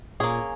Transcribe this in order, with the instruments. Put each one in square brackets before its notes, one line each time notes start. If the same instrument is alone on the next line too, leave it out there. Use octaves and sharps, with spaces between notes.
[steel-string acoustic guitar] A#2 [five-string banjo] A#3 C#4 G#4